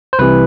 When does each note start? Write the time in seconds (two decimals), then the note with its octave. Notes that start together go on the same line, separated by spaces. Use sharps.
0.13 C5
0.19 C2 C3 E3 B4